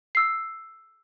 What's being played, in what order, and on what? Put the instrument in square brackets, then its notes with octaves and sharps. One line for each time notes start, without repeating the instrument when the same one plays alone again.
[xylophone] E6 C7